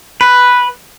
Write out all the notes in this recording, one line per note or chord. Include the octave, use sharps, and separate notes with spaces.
B4